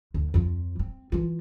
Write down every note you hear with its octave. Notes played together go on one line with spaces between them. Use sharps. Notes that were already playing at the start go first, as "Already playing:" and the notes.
D2
F2 F3
C4
E3 F4